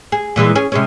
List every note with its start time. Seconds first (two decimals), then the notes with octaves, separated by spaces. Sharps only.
0.12 G#4
0.36 A#2 E3 G#3
0.55 C#4 G#4
0.72 C3 G#3 C#4